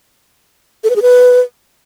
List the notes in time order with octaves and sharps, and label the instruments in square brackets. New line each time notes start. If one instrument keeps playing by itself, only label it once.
[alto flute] A4
B4
G#4
B4